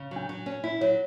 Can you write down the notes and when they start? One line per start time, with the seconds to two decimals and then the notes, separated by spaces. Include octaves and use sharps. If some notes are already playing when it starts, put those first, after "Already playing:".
Already playing: C#3
0.11 F#3 D4
0.29 F#3
0.46 C#4
0.64 E4
0.81 F#3 C#5